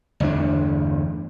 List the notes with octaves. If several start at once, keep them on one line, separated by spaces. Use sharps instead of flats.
G1 E2 A3 D4